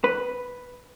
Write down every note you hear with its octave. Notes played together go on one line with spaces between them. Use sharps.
B4